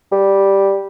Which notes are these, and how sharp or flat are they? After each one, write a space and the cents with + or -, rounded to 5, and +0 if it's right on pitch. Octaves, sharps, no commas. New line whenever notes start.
G3 +0